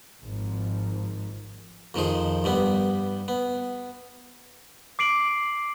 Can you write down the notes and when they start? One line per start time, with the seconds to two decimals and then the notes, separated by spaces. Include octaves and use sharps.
0.22 G#1 G#2 F3
1.94 F2 D#3 F3 G#4
2.44 G2 G3 B3
3.28 B3
4.99 D6 C7 D7 F#7